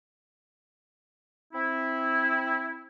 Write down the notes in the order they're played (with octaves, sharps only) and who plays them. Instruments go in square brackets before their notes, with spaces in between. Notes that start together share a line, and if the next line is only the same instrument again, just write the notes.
[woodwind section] C4 E4